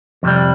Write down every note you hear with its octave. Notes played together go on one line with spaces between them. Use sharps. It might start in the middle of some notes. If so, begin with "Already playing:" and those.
F2 C3 G3